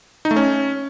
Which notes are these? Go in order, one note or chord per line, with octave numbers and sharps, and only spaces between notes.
D#4
A3
C#4